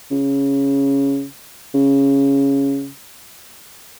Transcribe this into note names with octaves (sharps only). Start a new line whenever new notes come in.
C#3
C#3